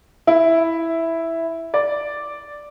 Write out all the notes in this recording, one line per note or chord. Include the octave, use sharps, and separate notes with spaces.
E4
D5